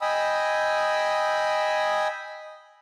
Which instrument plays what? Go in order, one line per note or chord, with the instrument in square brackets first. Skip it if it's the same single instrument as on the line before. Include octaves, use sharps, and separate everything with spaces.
[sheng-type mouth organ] D#5 G5 G#5 B5 D#6 E6